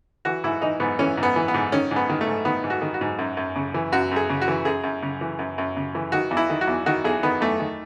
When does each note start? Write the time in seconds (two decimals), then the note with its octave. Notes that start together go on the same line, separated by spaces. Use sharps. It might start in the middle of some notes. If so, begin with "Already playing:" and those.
0.25 E3 F#4
0.44 G#2 E4
0.62 E3 D#4
0.80 G#2 B3
0.99 E3 C#4
1.18 G#2
1.23 B3
1.36 E3
1.48 B3
1.54 G#2
1.72 D#3 C#4
1.91 G#2
1.96 B3
2.09 D#3
2.21 A3
2.27 G#2
2.45 D#3 B3
2.64 G#2
2.70 F#4
2.82 D#3
2.94 F#4
3.01 G#2
3.19 F#2
3.37 F#2
3.55 C#3
3.74 E3
3.92 F#2 F#4
4.11 F#2 G#4
4.29 C#3
4.41 F#4
4.48 E3
4.65 F#2 G#4
4.84 F#2
5.02 C#3
5.21 E3
5.39 F#2
5.58 F#2
5.76 C#3
5.95 E3
6.12 D#3 F#4
6.31 E2
6.37 E4
6.50 D#3
6.61 F#4
6.67 E2
6.86 D#3 F#4
7.05 E2 G#4
7.23 D#3 B3
7.41 E2 A3
7.60 D#3